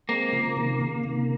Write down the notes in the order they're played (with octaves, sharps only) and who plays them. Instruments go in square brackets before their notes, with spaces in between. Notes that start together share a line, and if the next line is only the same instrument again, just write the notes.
[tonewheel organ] G#3 C4 [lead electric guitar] A#3
[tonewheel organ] C#3 F3
F3
C3 D#3
C#3
C3 D#3